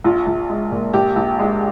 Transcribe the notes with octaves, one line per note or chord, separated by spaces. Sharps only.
A#1 F4
A#1
G#3
A#2
A#1 G4
A#1
G#3